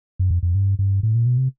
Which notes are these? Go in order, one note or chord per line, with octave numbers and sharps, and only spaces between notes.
F#2
F2
F2
G2
G2
A2
A#2
B2
C3